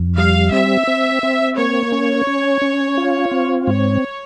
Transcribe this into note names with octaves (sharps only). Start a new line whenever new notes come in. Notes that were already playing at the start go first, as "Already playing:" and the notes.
Already playing: F2
G3 F5
C4 E5
C4
C4
A#3 C#5
C#4
C#4
C#4
F4
C4
G#2 C#5